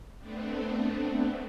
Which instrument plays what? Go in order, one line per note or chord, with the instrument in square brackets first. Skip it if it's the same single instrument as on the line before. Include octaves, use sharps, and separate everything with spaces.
[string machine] A3 B3 C4 D4